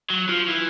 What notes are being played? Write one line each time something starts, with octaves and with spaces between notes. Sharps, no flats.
F#3
F3
E3